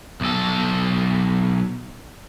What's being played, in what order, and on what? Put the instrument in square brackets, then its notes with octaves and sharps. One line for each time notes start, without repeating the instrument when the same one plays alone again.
[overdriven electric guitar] B1 A4